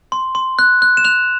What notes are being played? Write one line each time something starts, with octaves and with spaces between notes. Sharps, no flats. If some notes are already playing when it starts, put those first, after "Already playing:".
C6
C6
F#6
F#6
E7
F#6 F7